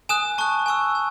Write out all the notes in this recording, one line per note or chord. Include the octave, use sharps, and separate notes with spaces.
G#5 D#6 F#6 E7
A5 C#6 F#6
G#5 C#6 E6
G#5